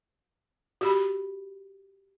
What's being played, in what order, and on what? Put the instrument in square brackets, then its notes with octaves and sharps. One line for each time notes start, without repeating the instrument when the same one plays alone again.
[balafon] F#4 G4 B5